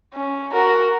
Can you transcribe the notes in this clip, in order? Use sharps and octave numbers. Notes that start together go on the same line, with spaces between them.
C#4
F#4 A#4